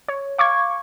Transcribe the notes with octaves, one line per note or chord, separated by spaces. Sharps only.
C#5
F5 C#6 D6 G#6